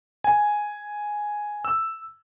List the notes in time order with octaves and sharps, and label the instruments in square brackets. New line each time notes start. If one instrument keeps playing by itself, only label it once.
[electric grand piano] G#5
E6